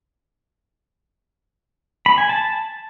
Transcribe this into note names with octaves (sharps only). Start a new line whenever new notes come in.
B5
G#5
A5